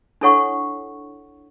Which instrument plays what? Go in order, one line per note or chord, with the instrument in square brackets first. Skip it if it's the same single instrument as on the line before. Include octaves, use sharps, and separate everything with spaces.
[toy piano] D4 E4 A4 C#5 F#5 C#6